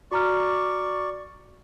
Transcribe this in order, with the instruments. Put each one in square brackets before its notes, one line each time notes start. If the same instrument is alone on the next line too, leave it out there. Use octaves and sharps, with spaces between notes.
[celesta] F#4 A#5 F6 [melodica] D5 C#6